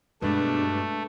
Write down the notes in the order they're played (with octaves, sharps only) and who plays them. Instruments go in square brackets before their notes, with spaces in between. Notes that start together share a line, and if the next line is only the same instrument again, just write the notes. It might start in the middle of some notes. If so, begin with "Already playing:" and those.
[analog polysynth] G2 B2 [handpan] G#3 B4 [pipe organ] A3 [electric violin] D4